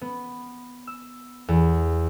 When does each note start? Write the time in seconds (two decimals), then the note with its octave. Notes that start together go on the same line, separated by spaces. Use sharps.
0.01 B3
0.87 E6
1.48 E2